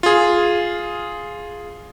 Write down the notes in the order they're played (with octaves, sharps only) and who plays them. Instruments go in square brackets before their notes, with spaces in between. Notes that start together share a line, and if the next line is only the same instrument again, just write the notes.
[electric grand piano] F4 G#4